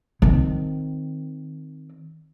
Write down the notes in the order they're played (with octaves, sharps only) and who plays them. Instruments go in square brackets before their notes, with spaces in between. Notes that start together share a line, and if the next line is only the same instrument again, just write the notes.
[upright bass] D#3 C4